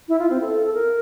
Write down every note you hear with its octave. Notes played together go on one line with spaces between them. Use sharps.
E4
F4
C4
A4
A4
A#4